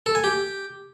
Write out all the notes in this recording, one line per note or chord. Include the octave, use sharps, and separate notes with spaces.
A4
G#5
G4